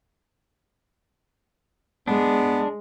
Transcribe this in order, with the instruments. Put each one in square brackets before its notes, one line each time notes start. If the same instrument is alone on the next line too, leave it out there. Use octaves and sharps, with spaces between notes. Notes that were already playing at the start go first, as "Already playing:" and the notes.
[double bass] G#3 [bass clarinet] B3 [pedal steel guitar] D4